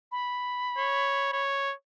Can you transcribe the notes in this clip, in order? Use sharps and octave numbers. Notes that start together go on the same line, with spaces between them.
B5
C#5
C#5